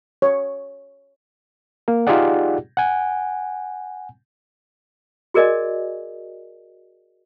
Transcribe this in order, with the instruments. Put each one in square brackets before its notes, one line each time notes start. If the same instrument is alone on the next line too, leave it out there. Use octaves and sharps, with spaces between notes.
[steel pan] C#5
[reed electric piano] A#3 A#4
D#4 F4 G4 G#4 D5 F#5
F#5 G#5
[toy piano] F#4 G#4 A#4 D5 D#5 G#5